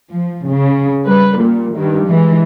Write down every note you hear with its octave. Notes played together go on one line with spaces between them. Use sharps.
F3
C#3
G3 B4
A#2 G3
G2 D#3
E3 G#3